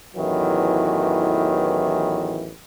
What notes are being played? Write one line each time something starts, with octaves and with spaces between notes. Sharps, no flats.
A1 E2 D#3 E3 F#3